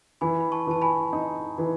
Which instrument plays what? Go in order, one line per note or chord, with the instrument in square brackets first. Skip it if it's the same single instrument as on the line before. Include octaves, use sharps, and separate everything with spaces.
[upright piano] E3 [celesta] G#5 B5
[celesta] B5
A5 C#6
[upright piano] E3 [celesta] A5
[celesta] G#5 B5
[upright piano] D#4
E3